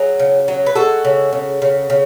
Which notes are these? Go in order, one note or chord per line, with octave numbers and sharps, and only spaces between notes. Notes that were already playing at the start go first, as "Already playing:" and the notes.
Already playing: F#3 E4 G#4
C#3
F#3
B4
G#3 F#4 A4
C#3
C#3
C#3
C#3